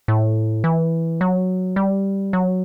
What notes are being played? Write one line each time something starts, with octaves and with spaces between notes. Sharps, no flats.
A2
E3
F#3
G3
F#3